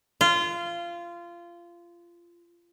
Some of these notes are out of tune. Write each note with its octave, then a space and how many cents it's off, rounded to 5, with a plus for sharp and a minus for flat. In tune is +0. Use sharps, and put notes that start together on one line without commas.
F4 -20